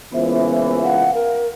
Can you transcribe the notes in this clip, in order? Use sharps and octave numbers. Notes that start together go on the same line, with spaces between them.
C#2 A#2 E3 B3 C5 E5
F5 F#5
A#4